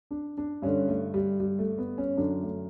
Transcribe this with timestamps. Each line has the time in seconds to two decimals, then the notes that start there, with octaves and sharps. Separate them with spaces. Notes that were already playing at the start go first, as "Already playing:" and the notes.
0.11 D4
0.38 D4
0.62 G2 D3 C#4
0.88 A3
1.14 G3
1.40 G3
1.59 A3
1.78 B3
1.98 C#4
2.17 F#2 D3 D4
2.43 A3